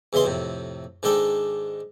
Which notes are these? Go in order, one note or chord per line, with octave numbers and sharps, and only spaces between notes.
E2 C#3 E3 D#5 C6
F2 A2 C3
G#2 D#3 G#3 D4 A4 G5